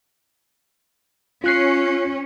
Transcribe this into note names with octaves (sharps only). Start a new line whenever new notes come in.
C#4 F4 F#6 C7